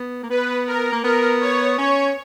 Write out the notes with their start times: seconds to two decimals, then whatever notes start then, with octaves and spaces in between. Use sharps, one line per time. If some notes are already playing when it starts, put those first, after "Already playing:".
Already playing: B3
0.23 A#3
0.30 B3 B4
0.67 A#4
0.92 A#3
1.04 B3 A#4
1.41 C#5
1.78 C#4 C#5